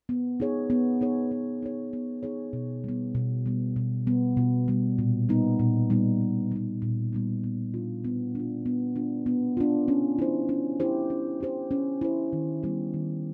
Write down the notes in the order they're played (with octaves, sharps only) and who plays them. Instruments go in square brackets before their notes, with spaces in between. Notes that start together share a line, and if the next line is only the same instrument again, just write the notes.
[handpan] B3
D#4 G#4 C#5
B3
D#4 G#4 C#5
B3
D#4 G#4 C#5
B3
D#4 G#4 C#5
B2
G3 B3
B2
G3 B3
B2
G3 B3
B2
G3 B3
A#2
G3 B3 D#4
A#2
G3 B3 D#4
A#2
G3 B3 D#4
A#2
G3 B3 D#4
B3
D4 F4
B3
D4 F4
B3
D4 F4
B3
D4 F4
C#4
E4 G4 C5
C#4
E4 G4 C5
C#4
E4 G4 C5
C#4
E4 G4 C5
D#3
G3 B3 E4 G4
D#3